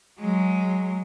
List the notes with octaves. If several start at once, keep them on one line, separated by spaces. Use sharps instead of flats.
F#3 G#3